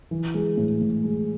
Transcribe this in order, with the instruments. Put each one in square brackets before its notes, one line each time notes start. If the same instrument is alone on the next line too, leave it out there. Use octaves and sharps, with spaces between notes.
[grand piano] E3
G#3
A2
A2
G#3